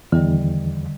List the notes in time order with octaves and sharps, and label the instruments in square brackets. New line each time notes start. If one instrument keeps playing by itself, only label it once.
[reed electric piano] E2 [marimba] D3 D#3 G3